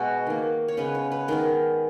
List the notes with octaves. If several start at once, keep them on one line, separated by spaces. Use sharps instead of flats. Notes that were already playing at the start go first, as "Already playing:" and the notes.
Already playing: B2 G#3 B3 F#4
D#3 A#3
C#5
C#3 G#3 B3 B4
C#5
B4
D#3 G#3 B3 A#4